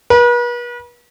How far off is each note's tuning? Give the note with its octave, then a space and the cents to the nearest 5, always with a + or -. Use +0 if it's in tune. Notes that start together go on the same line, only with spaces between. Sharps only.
B4 -40